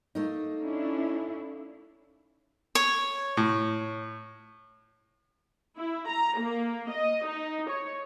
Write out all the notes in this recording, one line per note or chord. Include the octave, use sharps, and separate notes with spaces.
A3 A#3 D#4
C#4 D4 E4
C#5
A2
E4
A#5
A#3
D#5
D#4
C#5